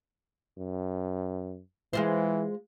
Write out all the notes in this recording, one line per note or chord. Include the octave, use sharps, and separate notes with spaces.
F#2
E3 G#3 F4 C5